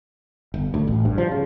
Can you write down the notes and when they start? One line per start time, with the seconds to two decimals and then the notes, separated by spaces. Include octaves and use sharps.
0.54 G1
0.74 D2
0.87 A1
1.05 G2
1.18 F3
1.31 C#3